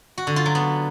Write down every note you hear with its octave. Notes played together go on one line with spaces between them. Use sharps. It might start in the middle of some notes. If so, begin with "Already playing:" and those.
F#4
D3
F4
F#3
B3